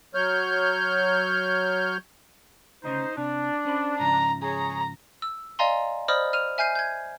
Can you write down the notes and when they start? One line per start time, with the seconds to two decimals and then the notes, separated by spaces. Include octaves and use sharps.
0.14 F#3 C#5 F6 G6
2.84 D2 C#3 D#4 C5
3.17 C3 D4
3.65 C#4 C5 B5
3.99 G#2 C#3 F3 A#5
4.43 G#4 C#5 A#5
5.22 E6
5.59 D5 D#5 F5 G#5 A#5 C6
6.08 C5 D5 D#5 B5 D#6 F6
6.33 F6 D#7 F7
6.58 E5 G#5 F6 G6 C7 D#7
6.75 G6 G#6